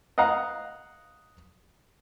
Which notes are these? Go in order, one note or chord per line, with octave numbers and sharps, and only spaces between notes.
D#5 F5 F#5 A#5